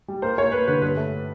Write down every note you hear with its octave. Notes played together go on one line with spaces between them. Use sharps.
G3
A#3 C5
A#3 C#5
A#3 B4
D3 B4
G2 B4
A3